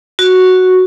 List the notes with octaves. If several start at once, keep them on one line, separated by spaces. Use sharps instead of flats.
F#4